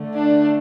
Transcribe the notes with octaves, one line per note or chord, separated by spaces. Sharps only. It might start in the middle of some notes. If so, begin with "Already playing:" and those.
Already playing: D3 A3
D4